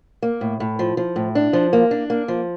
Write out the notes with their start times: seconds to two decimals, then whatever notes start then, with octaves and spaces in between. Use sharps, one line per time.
0.22 A#3
0.41 A2
0.60 A2
0.79 F3
0.97 F3
1.16 A2
1.35 D4
1.53 F3
1.73 A#3
1.91 D4
2.10 A#3
2.28 F3